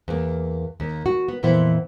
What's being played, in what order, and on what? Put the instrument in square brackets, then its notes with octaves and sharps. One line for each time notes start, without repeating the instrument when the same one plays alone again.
[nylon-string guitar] E2 A#3
D#2
F#4
B3
F2 A#2 E3 B3 C5